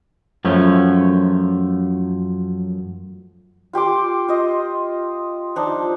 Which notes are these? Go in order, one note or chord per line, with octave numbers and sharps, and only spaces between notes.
F#2 F3 A3 C#4
F4 G4 C6 D6
F4 D#5
F3 D4 D#4